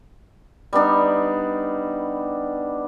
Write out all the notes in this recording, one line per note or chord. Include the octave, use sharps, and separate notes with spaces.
G3 B3 D4 D#4